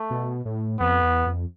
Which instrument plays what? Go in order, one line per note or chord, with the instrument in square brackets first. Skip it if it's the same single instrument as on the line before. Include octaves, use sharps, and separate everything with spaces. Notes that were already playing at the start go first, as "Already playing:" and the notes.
Already playing: [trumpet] A3
[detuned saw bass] B2
A2
[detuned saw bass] F2 [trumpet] B3
[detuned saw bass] E2
F2